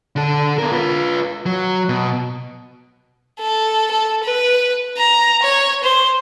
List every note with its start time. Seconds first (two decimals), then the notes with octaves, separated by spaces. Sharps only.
0.16 D3 A4
0.58 B3 A#4
0.72 F4 B4
1.46 F#3
1.89 B2
3.40 A4
3.91 A4
4.24 B4
4.97 A#5
5.43 C#5
5.83 C5